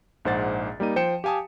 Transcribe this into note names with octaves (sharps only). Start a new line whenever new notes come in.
A#1 G#2 C5 F#5 A6
G3 A#3 D#4 D#7
F3 C5 G5 C#7 E7
G4 F5 G#5 A5 D#6